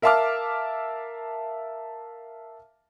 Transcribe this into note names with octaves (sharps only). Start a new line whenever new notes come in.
A#4 E5 F5 A5 D6 F6